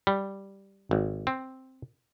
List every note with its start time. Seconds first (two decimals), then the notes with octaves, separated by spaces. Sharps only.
0.07 G3
0.91 G#1
1.27 C4